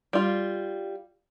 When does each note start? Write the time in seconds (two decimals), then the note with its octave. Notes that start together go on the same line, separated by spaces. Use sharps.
0.13 G3 F4